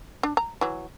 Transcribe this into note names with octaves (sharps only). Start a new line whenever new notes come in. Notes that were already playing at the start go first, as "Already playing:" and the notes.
D4
A#5
E3 F#3